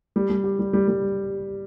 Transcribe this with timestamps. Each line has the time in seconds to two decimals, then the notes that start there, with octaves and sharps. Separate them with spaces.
0.16 G3
0.30 G3
0.44 G4
0.59 G3
0.73 G3
0.88 G3